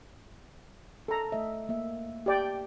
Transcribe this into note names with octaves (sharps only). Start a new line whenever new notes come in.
A4 A#5
A3 D#5 E5
A#3 E5
G4 D5 G5